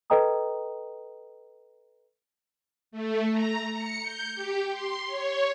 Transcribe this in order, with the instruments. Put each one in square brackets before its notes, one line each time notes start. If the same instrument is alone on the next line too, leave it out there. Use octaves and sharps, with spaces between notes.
[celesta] A4 B4 D#5 G5 A#5 D#6
[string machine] A3
A#5
C#7
G6
G4
C6
C#5